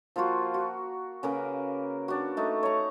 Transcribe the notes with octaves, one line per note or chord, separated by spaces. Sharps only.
F3 A#3 F4 F#4
F#4
C#3 A#3 A#4 B4
D4 F#4
A3 D#4
C#5 A#5